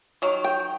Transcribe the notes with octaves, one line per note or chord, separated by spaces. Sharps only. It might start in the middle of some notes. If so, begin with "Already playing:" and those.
D#3 F#3
G5